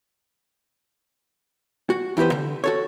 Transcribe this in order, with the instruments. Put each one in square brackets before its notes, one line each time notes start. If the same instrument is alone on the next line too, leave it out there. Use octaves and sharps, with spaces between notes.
[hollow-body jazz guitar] F#4
E2 E4 G4 B4 C5
D3
F#4 A4 C#5